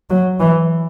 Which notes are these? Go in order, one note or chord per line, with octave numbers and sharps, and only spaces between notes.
F#3
E3